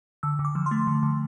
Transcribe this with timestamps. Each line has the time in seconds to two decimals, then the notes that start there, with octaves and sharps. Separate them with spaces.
0.23 D3 E6
0.39 D3
0.45 D6
0.55 F3
0.66 C6
0.71 A3
0.87 D3
1.03 D3